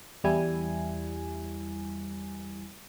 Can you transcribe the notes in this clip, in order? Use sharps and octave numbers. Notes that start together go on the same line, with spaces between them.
E2 G3 E4 G#5